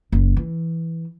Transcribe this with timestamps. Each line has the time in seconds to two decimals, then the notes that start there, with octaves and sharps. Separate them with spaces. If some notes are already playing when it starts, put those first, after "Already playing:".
0.12 F#1
0.37 E3